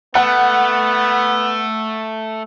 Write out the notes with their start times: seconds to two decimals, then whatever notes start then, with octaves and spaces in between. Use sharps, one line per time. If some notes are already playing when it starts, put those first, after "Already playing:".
0.15 A3 B3 F#5